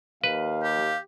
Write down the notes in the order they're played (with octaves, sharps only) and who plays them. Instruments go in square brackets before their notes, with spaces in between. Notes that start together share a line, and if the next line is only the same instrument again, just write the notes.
[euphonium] D#2 [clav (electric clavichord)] B4 [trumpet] F5
[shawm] G4